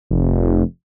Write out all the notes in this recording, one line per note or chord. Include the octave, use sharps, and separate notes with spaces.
F1